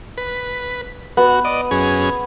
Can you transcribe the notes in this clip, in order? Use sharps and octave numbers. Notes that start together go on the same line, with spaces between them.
B4
B3 F#4
D5 D#5
F#2 C#4 G#4